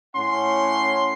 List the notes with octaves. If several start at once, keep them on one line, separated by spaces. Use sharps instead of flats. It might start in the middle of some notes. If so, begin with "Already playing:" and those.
A2 C#4 F#5 C6